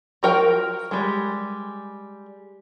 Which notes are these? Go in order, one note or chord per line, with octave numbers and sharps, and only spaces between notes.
F3 F#4 A#4 F5 G5
G3 G#3